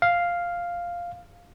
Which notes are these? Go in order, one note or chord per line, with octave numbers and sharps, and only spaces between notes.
F5